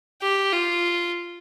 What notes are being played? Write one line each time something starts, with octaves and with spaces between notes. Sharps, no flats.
G4
F4